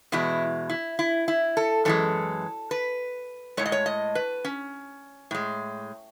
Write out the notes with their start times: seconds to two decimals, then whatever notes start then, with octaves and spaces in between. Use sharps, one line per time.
0.12 E2 B2 G#3 E4
0.69 E4
0.99 E4
1.28 E4
1.57 A4
1.85 F#2 E3 G#3 A4
2.71 B4
3.57 A2 G#3 C#5
3.66 D#5
3.72 C#5
3.86 D#5
4.15 B4
4.45 C#4
5.31 A2 G#3